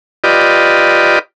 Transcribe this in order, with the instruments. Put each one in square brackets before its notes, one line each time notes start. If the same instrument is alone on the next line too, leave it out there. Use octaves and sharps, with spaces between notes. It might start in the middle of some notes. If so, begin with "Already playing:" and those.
[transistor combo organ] F4 G4 B4 D5 D#5